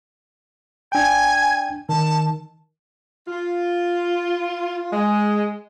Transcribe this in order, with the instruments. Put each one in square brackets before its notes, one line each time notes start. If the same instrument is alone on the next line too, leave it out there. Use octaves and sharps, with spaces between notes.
[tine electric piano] D4 G5 [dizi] G#5
[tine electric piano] D#3 [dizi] A5
[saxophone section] F4
G#3